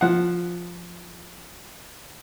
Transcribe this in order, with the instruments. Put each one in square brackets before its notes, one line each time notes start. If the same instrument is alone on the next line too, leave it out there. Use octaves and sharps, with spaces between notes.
[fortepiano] F3 F#5